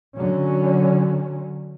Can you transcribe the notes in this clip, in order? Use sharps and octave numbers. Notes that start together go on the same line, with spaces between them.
D3 F#3 C#4